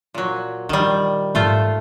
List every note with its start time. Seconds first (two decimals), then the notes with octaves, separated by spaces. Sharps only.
0.14 A#2 F#3
0.69 D#3 G3 D4
1.35 G#2 A3 F4 C5